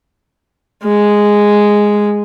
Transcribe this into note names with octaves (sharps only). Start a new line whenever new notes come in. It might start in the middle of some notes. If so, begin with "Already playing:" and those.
G#3